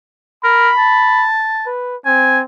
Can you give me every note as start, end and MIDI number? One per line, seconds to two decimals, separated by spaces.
0.44 0.70 70
0.44 1.27 83
0.77 1.67 81
1.66 1.96 71
2.06 2.43 60
2.06 2.39 80